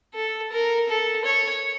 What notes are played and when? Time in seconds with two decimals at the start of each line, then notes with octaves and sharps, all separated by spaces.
0.15 A4
0.52 A#4
0.89 A4
1.25 C#5